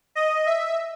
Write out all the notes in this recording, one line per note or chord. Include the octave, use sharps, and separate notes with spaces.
D#5
E5